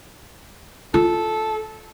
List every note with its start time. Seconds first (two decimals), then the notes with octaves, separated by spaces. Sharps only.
0.94 F4 A4